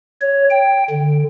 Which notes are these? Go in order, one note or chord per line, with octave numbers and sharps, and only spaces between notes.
C#5
G5
D3